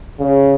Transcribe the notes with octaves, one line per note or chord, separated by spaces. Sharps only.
C#3